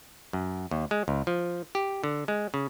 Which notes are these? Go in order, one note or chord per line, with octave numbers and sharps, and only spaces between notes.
F#2
D#2
G#3
C#2
F3
G4
D3
G#3
C#3